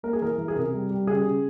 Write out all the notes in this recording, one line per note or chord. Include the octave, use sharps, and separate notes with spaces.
A#3 A#4
G#4
E3 A#4
E3
G#4
C3 A#4
G3
G3
C#3 G#4
C#3